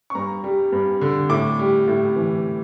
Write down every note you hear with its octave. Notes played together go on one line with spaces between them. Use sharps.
C#6
G2 A#5
G3
G2
D3
A2 D6
G3
A2
E3